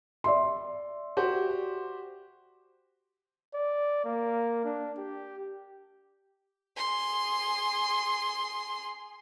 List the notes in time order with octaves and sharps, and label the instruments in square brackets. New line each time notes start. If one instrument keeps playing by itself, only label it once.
[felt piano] D5 E5 C6
[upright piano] F#4 G4 C5
[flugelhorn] D5
A#3
D4
G4
[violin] G#4 C6